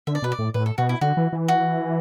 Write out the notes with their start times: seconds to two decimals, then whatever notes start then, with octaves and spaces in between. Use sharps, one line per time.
0.07 D3 E5
0.15 D5
0.22 B2 B4
0.32 D5
0.39 A2
0.54 A2 B4
0.66 A4
0.78 B2 F#4
0.89 E4
1.01 D3 F#4
1.17 E3
1.33 E3
1.48 F#4